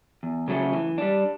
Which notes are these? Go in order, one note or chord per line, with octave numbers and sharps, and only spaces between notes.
E2
C#3 F#3 A3 C#4
E3
G3 D4